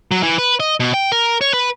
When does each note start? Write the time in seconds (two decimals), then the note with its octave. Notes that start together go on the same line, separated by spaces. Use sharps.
0.11 F#3
0.23 E3
0.38 B4
0.60 D#5
0.80 B2
0.94 G5
1.12 A#4
1.41 C#5
1.54 B4